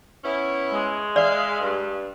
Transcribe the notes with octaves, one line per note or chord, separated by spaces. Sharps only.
B3 C#4 E4
G#3
D5 E5 F5
G2